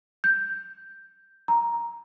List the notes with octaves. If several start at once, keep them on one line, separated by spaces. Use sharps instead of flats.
G6
A#5